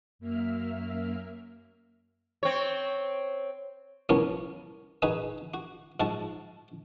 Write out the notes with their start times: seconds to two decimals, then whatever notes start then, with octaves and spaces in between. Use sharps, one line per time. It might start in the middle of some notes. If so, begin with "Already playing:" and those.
0.19 F#2 A#3 E5 F6
2.43 C4 C#5
4.09 C2 F3 B3 C#4 A#4 C#5
5.02 D#4 F#4 G#4 B4 G#5
5.54 F#4
6.00 G#2 F3 F#4 A5